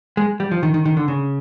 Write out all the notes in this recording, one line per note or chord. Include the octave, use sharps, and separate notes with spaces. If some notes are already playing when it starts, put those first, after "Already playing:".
G#3
G3
F3
D#3
D#3
D#3
D3
C#3